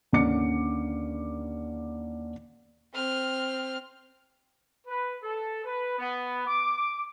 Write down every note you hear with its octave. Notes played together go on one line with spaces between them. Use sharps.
D#2 D3 C#4 D5 D6 C#7
C4 F6
B4
A4
B4
B3
D6